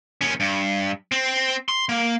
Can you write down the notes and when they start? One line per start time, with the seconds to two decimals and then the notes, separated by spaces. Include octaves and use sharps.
0.21 D#2 C#4
0.40 G2
1.12 C4
1.69 C6
1.89 A#3